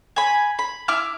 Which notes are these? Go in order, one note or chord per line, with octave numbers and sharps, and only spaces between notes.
G#5 B5
B5
E4 D6 F6